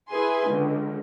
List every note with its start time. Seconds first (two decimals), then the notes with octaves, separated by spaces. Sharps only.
0.10 E4 G#4 B4 G#5 C6
0.49 C#2 D3